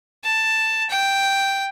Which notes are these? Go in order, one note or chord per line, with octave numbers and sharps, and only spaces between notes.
A5
G5